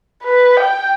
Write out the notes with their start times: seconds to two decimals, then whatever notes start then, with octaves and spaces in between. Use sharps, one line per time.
0.23 B4
0.57 G5